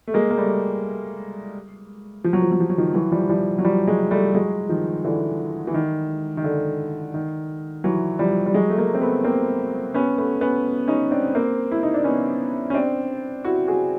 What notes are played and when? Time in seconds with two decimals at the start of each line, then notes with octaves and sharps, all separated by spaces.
0.07 A3
0.14 G#3 A#3
0.31 A#3
0.38 G3 A3
2.24 F3
2.33 F#3
2.42 F3
2.52 F#3
2.60 F3
2.70 F#3
2.78 D#3 F3
2.94 E3 F#3
3.12 F3 G3
3.29 F3 G3
3.58 F#3
3.65 F3 G3
3.88 F#3 G#3
4.11 G3 A3
4.35 F#3 G#3
4.69 D#3 F3
5.05 D3 E3
5.67 E3
5.74 D#3
6.37 D#3
6.44 D3
7.14 D#3
7.84 E3 F#3
8.19 F3 G3
8.46 G3
8.54 F#3 G#3
8.69 A3
8.78 G#3 A#3
8.94 C4
9.01 A3 B3
9.24 A#3 C4
9.94 B3 C#4
10.18 A3 B3
10.41 B3 C#4
10.88 C#4 D#4
11.11 C4 D4
11.35 A#3 C4
11.71 E4
11.83 D#4
11.94 D4
12.04 B3 C#4
12.70 C#4
12.74 C4 D4
13.44 E4 F#4
13.68 F#4 G#4